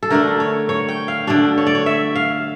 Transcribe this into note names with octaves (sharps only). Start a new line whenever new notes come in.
A4
D3 A3 D4 A#4
C#5
C#5
G5
F5
D3 A3 D4 D5
C#5
D5
C#5
E5
F5